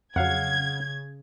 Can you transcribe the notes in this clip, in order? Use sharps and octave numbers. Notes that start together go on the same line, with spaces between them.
F2 C#3 F#3 F5 F#5 G#6